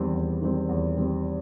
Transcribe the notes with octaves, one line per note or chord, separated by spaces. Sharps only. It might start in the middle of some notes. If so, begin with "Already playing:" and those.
Already playing: E2 D#3 G3 C4
E2
D#3 G3 C4
E2
D#3 G3 C4